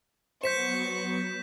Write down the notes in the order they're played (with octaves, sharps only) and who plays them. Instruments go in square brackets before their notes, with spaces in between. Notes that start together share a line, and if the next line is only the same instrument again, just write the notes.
[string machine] F#3 B3 F#4 [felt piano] C5 [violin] C#6 [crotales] G6 B6 E7